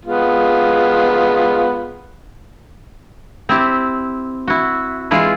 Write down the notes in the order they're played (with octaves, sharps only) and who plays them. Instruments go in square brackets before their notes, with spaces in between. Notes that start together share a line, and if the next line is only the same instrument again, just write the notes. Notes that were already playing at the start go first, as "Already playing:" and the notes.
[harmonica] G#3 B3 F4
[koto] C4 E4 G4
E4 F#4
E3 G#3 E4 F4